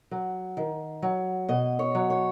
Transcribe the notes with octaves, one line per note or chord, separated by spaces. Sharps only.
F#3
D#3
F#3
B2 D#5
C#5
F#3
C#5